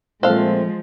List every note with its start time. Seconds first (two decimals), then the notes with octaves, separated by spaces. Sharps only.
0.23 A#2 F3 G#3 A3 C4 A4 C5 F5